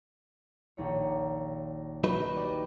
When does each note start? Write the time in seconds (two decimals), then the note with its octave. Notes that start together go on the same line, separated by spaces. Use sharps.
0.77 A#1 D#2 C#5
2.04 F#3 D#4 B4
2.36 G4 D5